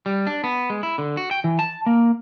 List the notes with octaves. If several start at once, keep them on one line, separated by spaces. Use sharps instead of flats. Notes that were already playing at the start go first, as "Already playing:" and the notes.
G3
D4
B3
G#3
E4
D3
F#4
G5
E3
A5
A#3